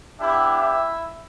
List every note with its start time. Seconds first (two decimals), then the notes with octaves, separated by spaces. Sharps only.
0.20 B3 D4 E4 G4 E5
0.60 E4 E5